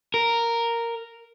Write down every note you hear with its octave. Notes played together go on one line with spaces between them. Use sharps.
A#4